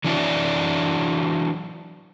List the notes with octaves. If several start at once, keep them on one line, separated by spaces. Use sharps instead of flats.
E3 F#3 D4 E4 F#4 D5